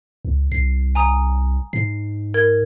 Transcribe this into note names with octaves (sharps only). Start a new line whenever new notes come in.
C#2
C2 C7
G#5 A#5 D#6
G#2 C7
A#4 G#6